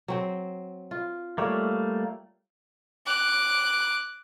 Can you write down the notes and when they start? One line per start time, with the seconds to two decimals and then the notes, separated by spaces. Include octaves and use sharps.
0.08 F#3 C4 C5
0.91 F4
1.38 G3 A3 A#3 C#5
3.06 D6 F#6